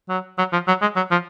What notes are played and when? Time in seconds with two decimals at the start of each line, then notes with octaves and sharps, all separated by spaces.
0.09 F#3
0.38 F#3
0.52 F3
0.67 F#3
0.81 G#3
0.96 F#3
1.11 F3